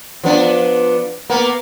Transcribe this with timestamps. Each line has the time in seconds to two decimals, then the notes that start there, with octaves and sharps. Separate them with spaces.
0.24 F3 B3 D4
1.30 A#3 B3